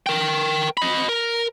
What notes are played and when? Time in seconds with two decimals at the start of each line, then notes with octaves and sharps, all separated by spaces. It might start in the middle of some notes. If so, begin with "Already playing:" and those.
0.06 A#4 G5
0.77 D#5 B5
1.09 A#4